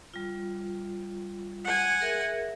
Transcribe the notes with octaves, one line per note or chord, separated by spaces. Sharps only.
G3 F4
F#5 G#5
G#4 A#4 E5